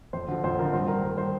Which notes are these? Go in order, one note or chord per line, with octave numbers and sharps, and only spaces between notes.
F2 C5
D3 F3
F2 C5
D3 F3 A#4
G2 C5
D#3 A#4
G2 A#4
D#3 C5